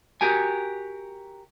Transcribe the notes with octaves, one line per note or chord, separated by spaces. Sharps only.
F#4 G4 A#4 G#5